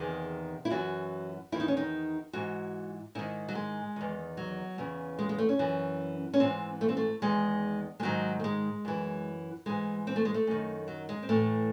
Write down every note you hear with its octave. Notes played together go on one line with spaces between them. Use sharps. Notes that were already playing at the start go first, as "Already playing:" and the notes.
Already playing: E2 C3 D#3 G#4
E4
F#2 E3 F#4
E2 D#3 E4
D#4
C#4
D#4
G#2 E3 F#4
G#2 D#3 E4
F#3
G#3
E2 D#3
F#3
E2 C#3 E3
G#3
G#3
A3
C#4
F#2 E3
C#4
G#2 E3 C4
A3
C4
A3
E2 D#3 G#3
G#3
G#2 D#3 F#3
A3
G#3
F#2 E3
G#2 E3 G#3
C4
A3
G#3
A3
F#2 D#3
F#3
G#3
C4
A2 E3 A3